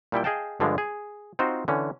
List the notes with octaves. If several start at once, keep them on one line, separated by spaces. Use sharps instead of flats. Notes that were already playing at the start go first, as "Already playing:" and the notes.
A#2 G3 E4 G5
G#4 D#5 F5 G5 A5
G2 D3 F3 G#3
G#4
C4 D#4 F4 F#4 C5
D3 E3 C#4